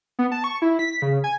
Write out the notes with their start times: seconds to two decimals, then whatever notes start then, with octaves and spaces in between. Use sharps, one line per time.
0.19 B3
0.32 A5
0.44 C#6
0.62 E4
0.79 B6
1.02 C#3
1.24 G#5